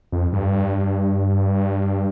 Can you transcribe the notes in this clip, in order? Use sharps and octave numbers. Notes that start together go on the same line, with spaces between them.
F2
G2